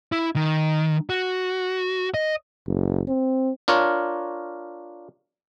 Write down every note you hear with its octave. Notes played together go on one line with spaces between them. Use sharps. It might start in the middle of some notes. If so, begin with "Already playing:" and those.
E4
D#3
F#4
D#5
F#1
C4
D4 F4 A#4 C#5